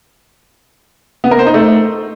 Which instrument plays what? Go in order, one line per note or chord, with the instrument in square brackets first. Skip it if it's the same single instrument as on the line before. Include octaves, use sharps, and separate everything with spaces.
[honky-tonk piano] B3
A#4
C5
D#4
A3